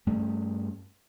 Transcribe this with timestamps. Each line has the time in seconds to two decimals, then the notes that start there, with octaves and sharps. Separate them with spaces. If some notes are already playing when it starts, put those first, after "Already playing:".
0.07 G2 A3 C#4